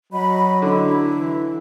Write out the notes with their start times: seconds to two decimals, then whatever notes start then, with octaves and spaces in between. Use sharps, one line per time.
0.12 F#3 D#5 B5
0.62 D3 E4
1.18 E3